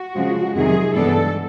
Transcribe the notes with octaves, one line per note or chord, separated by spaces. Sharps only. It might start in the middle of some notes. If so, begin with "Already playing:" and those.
Already playing: F#4
F2 C#3 F3 G#3
F2 C3 D#3 F#3 G#4
G2 E3 G#3 B3 D4 A4